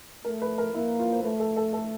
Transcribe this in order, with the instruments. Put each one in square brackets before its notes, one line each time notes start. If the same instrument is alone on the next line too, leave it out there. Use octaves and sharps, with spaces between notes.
[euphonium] A3 [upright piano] A#4
[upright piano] B4
A#4
[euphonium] A#3 [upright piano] E4
[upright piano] F4
C5
[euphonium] A3 [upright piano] B4
[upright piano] A4
A4
A4